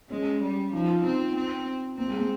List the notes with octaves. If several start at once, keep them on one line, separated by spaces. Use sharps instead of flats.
G#3 C#4
G3
F3 D#4
F4
C4 D#4
D#4
C4
A#3 C4
G#3
A#3